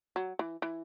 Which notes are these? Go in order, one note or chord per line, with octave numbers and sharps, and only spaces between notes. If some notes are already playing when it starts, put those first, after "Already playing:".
F#3
E3
E3